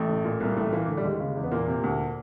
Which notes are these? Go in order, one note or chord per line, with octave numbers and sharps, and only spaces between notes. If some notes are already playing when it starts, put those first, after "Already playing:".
Already playing: A1 A3
A2
A#2
C2
A#3
A1 A2 A3
A#2 E3 A#3
A2 D3 A3
G3
D#2 G#3
C#3
E2
B3
E2 A#2 A#3
C3
D2